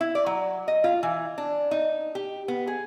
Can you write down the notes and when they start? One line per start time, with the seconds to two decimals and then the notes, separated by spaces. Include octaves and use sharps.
0.01 E4
0.15 D5
0.26 F#3
0.68 D#5
0.84 F4
1.03 E3
1.38 D4
1.71 D#4
2.15 G4
2.48 B3
2.67 G#4